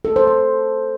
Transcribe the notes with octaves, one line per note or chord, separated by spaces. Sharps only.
A4
C5
C5